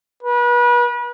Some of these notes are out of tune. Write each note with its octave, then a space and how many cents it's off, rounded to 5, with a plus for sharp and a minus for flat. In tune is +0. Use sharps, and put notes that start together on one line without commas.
B4 -35